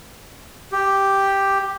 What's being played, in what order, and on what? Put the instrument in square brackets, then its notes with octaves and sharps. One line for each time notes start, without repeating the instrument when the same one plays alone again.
[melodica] G4